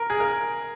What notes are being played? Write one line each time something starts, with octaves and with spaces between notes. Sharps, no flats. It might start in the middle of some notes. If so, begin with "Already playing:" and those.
Already playing: A#4
G#4
A#4